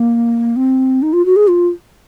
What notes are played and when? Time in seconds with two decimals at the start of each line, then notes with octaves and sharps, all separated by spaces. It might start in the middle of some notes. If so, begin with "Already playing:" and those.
Already playing: A#3
0.56 C4
1.02 D#4
1.13 F4
1.25 F#4
1.36 G#4
1.48 F4